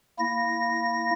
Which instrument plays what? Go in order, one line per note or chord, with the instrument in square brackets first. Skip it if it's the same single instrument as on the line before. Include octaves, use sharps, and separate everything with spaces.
[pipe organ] A#3 E4 A#6